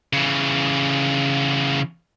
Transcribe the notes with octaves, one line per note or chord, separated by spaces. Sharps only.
C#3 E3